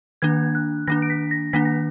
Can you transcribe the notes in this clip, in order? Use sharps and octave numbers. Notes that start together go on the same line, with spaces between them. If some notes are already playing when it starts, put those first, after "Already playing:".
D#3 A#3 D4 G#6
F#6
D#3 A#3 D4 A#6
D7
B6
A#6
D#3 A#3 D4 B6
A#6